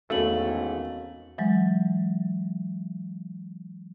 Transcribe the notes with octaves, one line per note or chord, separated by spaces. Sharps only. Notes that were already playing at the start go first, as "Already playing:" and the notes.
G#1 E2 A3 C#4 F#4 F5 F#7
E3 F#3 G#3